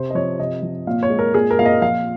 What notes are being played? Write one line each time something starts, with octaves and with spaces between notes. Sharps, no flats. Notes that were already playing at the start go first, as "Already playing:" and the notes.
Already playing: C3 C5
D#5
F3 C#5
C3 D#5
F3
A#2 F5
C#5
G#3
A#4
A#2 G#4
A#4
A#2 F5
D#5
F3 F5